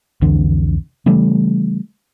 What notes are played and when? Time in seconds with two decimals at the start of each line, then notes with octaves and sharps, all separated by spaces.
0.21 C2 F2 D3 E3
1.06 C#3 E3 G3 A3